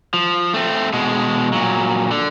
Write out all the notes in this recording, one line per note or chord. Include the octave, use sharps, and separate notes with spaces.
F3
A3 C4
B2 G#3
A#2 F#3
D3